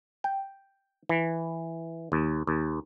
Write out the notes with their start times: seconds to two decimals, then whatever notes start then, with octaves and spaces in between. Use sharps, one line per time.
0.24 G5
1.09 E3
2.12 D#2
2.47 D#2